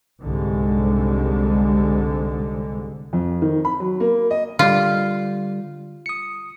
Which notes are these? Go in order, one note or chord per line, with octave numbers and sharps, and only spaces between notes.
C2 G#2 D3 G#3
F2
D#3
B5
F#3
A#3
D#5
D3 G3 F4
D#6 C#7